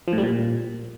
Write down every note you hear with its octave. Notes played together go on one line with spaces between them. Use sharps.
F3
A2
G3
A#2